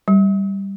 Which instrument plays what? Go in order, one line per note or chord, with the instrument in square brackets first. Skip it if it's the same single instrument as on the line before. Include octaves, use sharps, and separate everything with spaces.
[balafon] G3